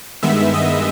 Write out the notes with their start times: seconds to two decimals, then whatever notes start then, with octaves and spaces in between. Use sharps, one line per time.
0.23 G2 D#3 G#3 B3 E5
0.54 D#5